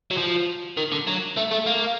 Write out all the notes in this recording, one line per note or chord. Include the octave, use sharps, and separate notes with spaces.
F#3
F3
D#3
D3
F#3
A3
A3
A#3